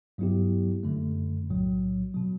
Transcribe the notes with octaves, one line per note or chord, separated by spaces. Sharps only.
G2 F#3 B3 E4 G4
F#2 D3 A3
B1 A2 F#3
B2 F#3